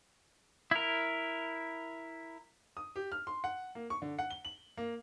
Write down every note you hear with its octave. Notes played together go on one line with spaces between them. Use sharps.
E4 A#4
D#6
G4
F6
C6
F#5
A#3
C#6
D3
F#5
G7
F#7
A#3